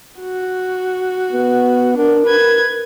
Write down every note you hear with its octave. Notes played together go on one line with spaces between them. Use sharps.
F#4
B3
D4 A#4
B4 G#6